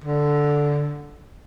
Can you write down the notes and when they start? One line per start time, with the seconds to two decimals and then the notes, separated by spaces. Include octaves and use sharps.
0.04 D3